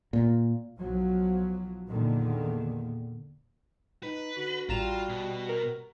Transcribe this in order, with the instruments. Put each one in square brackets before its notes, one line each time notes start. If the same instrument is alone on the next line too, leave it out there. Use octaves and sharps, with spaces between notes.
[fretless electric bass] A#2
[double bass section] B1 F3 F#3
E2 A#2 D3 D#3
[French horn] D#4 [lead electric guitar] B4
[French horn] D3 [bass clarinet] F#4
[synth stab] A1 A#5 E7 [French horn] G3 [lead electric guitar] F4
[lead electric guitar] B2
[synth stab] A#4